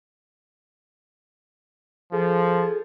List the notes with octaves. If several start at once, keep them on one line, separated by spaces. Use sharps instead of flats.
F3 G#4 A4